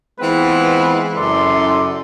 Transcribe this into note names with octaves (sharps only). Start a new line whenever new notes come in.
E3 G#3 B3 C4 F4 B4
F#2 C#3 E4 A4 D5 C6